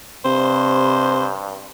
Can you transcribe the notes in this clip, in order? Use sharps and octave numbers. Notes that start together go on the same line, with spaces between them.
G2 C3 C5